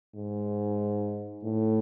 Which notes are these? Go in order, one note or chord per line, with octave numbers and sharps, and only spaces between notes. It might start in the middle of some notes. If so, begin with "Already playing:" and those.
G#2
A2